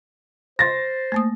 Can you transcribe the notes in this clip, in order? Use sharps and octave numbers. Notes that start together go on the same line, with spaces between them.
C5 C6 A6 A#6
A3 A#3 D#6